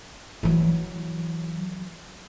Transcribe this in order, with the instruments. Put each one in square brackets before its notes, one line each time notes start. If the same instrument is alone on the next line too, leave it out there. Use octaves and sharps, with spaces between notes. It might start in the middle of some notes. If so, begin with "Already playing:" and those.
[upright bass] E3 F#3